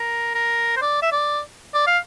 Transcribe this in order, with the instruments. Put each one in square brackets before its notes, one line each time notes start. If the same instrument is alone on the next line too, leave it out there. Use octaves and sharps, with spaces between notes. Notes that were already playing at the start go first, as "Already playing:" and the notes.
Already playing: [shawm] A#4
A#4
C5
D5
E5
D5
D5
F5